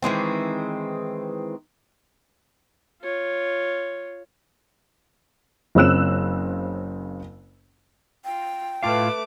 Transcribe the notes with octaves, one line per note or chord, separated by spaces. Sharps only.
D#3 E3 G#3 C4
F4 C#5
F#1 C#3 C4 E6 F#6 E7
F4 G5
A2 A3 F4 B4 F5 A5 D6